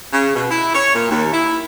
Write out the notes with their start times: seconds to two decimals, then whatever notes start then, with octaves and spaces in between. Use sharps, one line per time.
0.13 C#3
0.34 B2
0.50 E4
0.74 C#5
0.93 A#2
1.10 D#2
1.33 E4